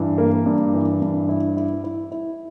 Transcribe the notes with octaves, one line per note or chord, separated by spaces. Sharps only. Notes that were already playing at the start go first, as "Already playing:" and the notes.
Already playing: G2 E3
A#3
G2
E3
G2
E4
E4
E4
E4